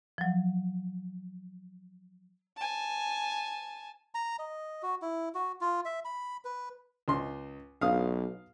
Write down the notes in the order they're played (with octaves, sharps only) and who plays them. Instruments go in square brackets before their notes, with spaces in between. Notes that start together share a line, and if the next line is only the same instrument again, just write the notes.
[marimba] F3 F#3
[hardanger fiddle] G#5 A5
[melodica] A#5
D#5
F#4
E4
F#4
F4
E5
B5
B4
[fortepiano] C#2 C6
[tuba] B1 [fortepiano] F5 D#6